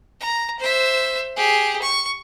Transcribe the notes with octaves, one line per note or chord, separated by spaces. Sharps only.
A#5
C5 E5
G4 G#4
C#6